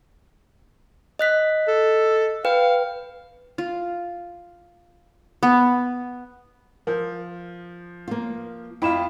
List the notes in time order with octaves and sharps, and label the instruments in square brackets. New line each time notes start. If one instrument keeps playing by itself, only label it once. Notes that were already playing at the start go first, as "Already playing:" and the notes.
[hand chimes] D#5 F#6 B6
[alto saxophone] A4
[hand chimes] B4 G5 [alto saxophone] F5
[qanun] F4
B3
[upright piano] F3 [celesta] A#4
[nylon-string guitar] A#3 F4
[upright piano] F2 F4 [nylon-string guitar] E4 [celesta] G5 B5 E7